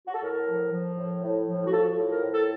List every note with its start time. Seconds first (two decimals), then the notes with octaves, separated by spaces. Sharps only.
0.07 F#4
0.14 A4
0.23 A2 A#4
0.47 F3
0.72 F3
0.97 A2
1.23 A2
1.48 F3
1.67 F#4
1.72 F3 A4
1.97 A2
2.11 A#4
2.23 A2
2.34 A4